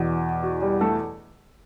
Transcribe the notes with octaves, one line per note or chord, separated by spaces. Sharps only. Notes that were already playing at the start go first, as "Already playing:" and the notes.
Already playing: E2 B2 F#4
F#4
G3 G4
A3 A4